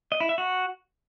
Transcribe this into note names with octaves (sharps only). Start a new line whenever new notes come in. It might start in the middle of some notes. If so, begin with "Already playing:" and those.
D#5
E4
E5
F#4